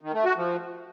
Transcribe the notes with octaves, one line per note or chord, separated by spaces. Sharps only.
D#3
A3
F#4
F3